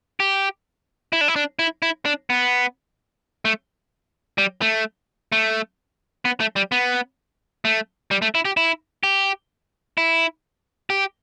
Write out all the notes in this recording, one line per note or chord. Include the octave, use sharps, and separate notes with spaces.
G4
E4
D4
E4
D4
E4
E4
D4
B3
A3
G3
A3
A3
B3
A3
G3
B3
A3
G3
A3
E4
G4
E4
G4
E4
G4